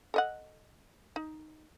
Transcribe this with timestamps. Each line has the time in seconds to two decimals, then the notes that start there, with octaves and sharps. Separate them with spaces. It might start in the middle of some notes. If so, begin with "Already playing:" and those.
0.14 A4 D#5 F#5
1.16 D#4